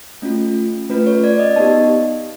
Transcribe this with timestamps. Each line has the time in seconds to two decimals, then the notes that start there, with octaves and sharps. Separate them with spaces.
0.22 A3 C#4 F4
0.90 A3 C#4 F4 B4
1.06 C#5
1.24 D5
1.39 D#5
1.56 B3 D#4 G4 A5